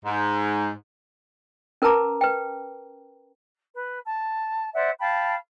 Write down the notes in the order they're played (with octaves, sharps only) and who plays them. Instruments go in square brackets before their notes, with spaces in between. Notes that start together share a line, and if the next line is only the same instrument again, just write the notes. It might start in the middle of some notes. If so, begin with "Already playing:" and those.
[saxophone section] G#2
[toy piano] C#4 A#4 B4 A5 A#5 D6
B4 G5
[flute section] B4
A5
C5 D5 E5 F#5
F5 G5 A5 B5